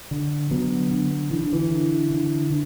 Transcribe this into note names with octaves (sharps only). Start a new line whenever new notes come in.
D3
D3 F#3 B3
D3
D3 E3
D3
E3
D3
D3
D3